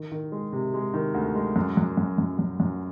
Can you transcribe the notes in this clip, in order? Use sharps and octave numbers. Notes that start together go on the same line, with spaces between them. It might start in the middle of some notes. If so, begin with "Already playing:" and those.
Already playing: D#3
D#3
G#3
C3
G#3
D#3
D2
G#3
F#2
F#2
F#2
F#2
F#2
F#2